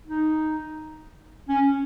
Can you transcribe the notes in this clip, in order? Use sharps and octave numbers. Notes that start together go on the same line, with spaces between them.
D#4
C#4